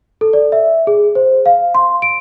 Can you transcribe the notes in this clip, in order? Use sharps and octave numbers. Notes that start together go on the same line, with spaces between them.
A4
D5
E5
G#4
C5
F5
C6
D7